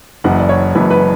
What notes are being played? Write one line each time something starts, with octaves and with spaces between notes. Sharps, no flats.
F#1 F#2 E3 F#5
D5
C#5
F#1 F#2 E3 B4
B4